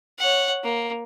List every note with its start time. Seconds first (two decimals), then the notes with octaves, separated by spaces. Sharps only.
0.19 C#5 F#5
0.63 A#3